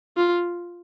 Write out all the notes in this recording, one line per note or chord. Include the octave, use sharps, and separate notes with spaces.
F4